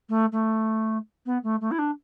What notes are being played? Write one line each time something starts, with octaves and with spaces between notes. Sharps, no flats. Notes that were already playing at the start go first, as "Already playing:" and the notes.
A3
A3
B3
A3
A3
E4
D4